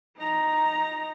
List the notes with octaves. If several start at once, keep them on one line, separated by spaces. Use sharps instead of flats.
D#4 A#5